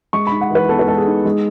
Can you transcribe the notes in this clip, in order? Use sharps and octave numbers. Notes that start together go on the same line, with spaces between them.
G#3 C#6
D#4 B5
F#5
E3 B4
B3 A4
B4
G#3 A4
G#4
D#4
G#3